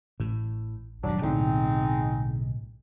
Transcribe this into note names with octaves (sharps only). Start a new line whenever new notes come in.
A1 A2
D#1 G2 F#3 D4
B1 A2 D3 G#3 C4 D#4